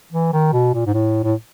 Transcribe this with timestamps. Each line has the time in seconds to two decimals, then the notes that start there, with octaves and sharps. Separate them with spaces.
0.13 E3
0.33 D#3
0.53 B2
0.74 A#2
0.86 G#2
0.94 A2
1.24 A2